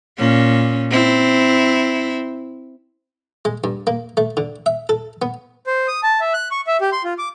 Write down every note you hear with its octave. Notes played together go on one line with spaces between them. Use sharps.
A#2 C#4
C4 E4
G#3
G2
A#3
A3
D3
E5
A4
B3
C5
D#6
A5
E5
F#6
C#6
E5
G4
C6
F4
D6